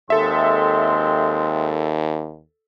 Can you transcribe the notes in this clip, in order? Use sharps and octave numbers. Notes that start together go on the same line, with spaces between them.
D#2 G#3 C4 A4 E5 C6